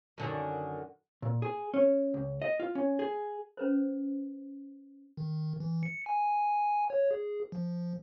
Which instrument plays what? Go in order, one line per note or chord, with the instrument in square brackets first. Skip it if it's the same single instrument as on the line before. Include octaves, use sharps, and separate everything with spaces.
[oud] F#2 D3 D#3
[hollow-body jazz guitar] A#2
G#4
C#4
C#2
D#5
F4
C#4
G#4
[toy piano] C#4 B4 C5
[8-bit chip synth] D#3
E3
C#7
G#5
C#5
G#4
F3